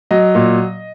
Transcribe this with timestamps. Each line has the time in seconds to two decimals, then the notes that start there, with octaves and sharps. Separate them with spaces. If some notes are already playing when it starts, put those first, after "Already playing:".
0.11 F#3 D#5
0.35 A#2